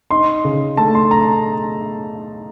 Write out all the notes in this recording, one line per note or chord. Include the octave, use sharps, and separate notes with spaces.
D#4 C6
C#3
A3 A5
C6
A#5